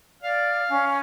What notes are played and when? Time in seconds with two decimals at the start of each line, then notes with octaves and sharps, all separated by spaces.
0.22 D5 F5
0.69 C#4